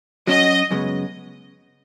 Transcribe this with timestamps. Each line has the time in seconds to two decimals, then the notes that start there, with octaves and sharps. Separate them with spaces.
0.27 F#3 C#4 F#4 D#5
0.71 F#2 C#3 G#3 B3